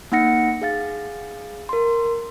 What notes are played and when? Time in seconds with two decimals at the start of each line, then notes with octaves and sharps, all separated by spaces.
0.12 A#3 D#4 F#5 A#6 C#7
0.62 G#4 F5 A6
1.69 A#4 C6